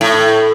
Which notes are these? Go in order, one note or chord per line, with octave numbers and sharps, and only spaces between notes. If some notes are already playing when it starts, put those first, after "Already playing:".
A2